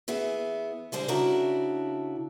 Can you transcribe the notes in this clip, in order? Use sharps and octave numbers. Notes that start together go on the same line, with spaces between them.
E3 B3 G#4 E5
D3 G3 G#3 C5
C#3 D4 E4 F#4 A#5